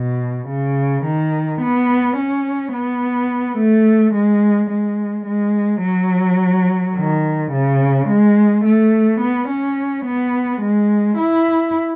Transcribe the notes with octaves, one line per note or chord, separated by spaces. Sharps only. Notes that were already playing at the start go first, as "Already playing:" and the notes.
Already playing: B2
C#3
D#3
B3
C#4
B3
A3
G#3
G#3
G#3
F#3
D#3
C#3
G#3
A3
B3
C#4
B3
G#3
E4